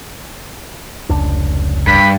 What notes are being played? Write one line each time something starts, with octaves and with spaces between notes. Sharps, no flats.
F1 C#2 D4
G2 B5